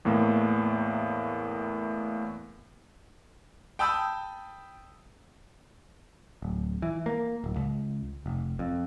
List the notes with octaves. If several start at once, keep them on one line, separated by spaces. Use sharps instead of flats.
E2 A2 A#3
G5 A5 B5 D#6 E6 G6
D1
E3
A#3
D1
C#2
F1
F2